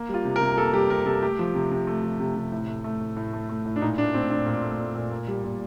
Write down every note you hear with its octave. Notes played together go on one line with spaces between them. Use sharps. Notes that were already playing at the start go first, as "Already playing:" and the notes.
Already playing: A#3
G3
F4
C3
A#4
C3
A#3 A4
G3 G4
C3 A#4
C3 A4
A3 G4
F3
C3
C3
A3
F3
C3
C3
A2
A3
A3
A2
A2
A3
A3
A2
D4
A#2 D#4
A3 D4
A3 C4
A#2 D4
A#2
A3
A3
A#2
A#3
G3
A#2